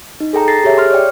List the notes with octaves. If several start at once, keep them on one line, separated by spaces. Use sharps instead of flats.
D#4
G#4 A4 G5 A#5
A4 A6 A#6 C7
G4 G#4 C#5 E5
C6 F6
C#5 D5 G5